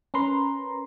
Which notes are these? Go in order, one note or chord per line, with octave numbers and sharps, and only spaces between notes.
C#4 A#4 B4 A#5 C6